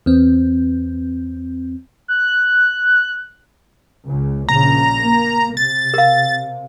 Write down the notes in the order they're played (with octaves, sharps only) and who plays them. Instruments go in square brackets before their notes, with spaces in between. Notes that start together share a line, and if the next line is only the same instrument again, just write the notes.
[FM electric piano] E2 C4
[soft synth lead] F#6
[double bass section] C#2
[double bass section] A#1 C#3 [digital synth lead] A#5
[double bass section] A#3
[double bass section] C3 [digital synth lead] A6
[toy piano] A#4 F5